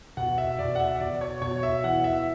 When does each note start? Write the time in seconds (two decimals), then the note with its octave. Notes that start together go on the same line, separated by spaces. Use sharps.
0.17 B2 F#5
0.38 E5
0.59 B2 D5
0.75 F#5
0.79 E5
1.00 B2 D5
1.21 C#5
1.42 B2 C#5
1.63 E5
1.84 E3 F#5
2.04 E5